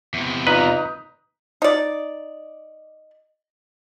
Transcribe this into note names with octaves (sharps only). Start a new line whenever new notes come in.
E2 C3
D#4 F4 B4 D5 A#5
D#4 D5